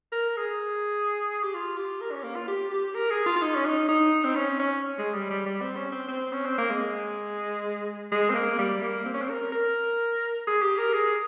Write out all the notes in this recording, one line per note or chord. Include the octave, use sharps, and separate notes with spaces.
A#4
G#4
G4
F4
G4
A#4
C#4
A#3
F4
G4
G4
A#4
G#4
F4
F4
D#4
C#4
D#4
D#4
C4
C#4
C#4
G#3
G3
G3
G3
C4
C#4
C4
C4
C#4
C4
A#3
G#3
G#3
C4
A#3
G3
A#3
C4
C#4
C4
A#4
A#4
G#4
G4
A#4
G#4